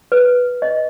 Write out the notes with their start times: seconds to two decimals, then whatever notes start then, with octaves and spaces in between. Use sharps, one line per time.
0.12 B4
0.62 D#5